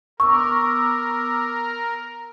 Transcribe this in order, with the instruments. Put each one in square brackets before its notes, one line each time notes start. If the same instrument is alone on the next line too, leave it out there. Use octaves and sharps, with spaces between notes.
[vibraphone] B3 D6 E6 [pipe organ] A#4 [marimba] C#6